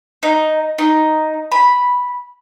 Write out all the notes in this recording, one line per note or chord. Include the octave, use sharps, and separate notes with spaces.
D#4
D#4
B5